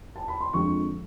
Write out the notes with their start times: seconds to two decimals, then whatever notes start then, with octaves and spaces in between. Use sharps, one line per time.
0.16 A5
0.28 B5
0.41 C6
0.53 F2 D3 F3 G#3 C#6